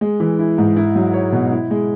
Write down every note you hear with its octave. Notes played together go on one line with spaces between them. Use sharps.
G#3
E3
E4
G#2
E4
F#3
C#5
B2
E4
G#3